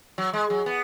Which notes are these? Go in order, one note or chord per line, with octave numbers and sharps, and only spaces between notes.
F#3
G#3
F#3
B3